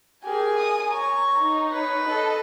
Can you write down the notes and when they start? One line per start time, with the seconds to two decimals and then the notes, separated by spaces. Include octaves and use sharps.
0.24 G4 G#4 A#4 G#5
0.57 D#6
0.91 C#5 A#5 C#6
1.38 D#4
1.72 B4 C#5
2.08 A4 D#5